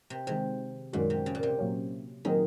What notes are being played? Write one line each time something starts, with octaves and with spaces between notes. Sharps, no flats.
C3
C3 D#3 G#3 C4
F#2 A#2 D#3 G#3 C#4 F#4
C3
C#3
A#2
C3
A#2 F#3 A#3 C#4
A#2 D#3 F#3 C4 D#4 G#4